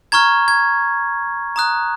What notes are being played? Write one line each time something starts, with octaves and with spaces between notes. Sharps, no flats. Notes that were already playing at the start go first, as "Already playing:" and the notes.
A#5 C#6 F6 G#6
G#6
A#5 D#6 F#6